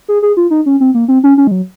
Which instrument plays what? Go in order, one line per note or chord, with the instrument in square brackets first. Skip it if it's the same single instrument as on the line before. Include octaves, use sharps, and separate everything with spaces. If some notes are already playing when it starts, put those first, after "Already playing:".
[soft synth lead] G#4
G#4
F4
D#4
C#4
C4
A#3
C4
C#4
C#4
G#3
F#3